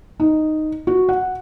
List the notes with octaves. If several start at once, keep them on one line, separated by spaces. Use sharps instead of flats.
D#4
F#4
F#5